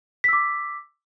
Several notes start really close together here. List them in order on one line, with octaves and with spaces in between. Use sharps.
B6 E6 D6